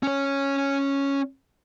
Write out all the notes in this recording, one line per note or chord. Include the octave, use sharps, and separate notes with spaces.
C#4 C#5